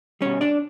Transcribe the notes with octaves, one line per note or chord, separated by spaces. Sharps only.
B2 G3 C#4 C#5
D4 D5